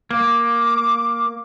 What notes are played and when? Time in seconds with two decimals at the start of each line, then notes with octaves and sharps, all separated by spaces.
0.11 A#3 D6